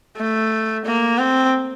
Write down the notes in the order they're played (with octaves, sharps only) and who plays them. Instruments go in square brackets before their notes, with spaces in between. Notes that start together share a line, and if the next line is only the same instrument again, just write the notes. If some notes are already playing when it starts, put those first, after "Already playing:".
[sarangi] A3
A#3
C4